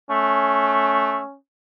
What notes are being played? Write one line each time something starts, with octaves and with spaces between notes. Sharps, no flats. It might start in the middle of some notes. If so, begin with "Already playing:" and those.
A3 C#4